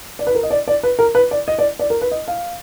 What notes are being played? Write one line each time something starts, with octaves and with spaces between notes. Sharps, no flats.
D5
B4
A#4
D#5
D5
D5
B4
A#4
B4
D5
D#5
D5
D5
A#4
B4
D#5
F5